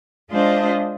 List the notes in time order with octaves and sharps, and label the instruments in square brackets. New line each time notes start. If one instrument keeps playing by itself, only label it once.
[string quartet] G#3 D4 F4 C5 D#5